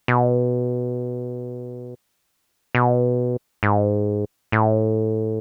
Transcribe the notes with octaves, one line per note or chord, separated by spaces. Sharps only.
B2
B2
G#2
A2